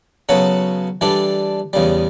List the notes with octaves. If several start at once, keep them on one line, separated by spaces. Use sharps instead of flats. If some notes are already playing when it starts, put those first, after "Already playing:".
C#3 F#3 B3 F#4 A4
E3 G3 D4 A4
E2 C#3 G3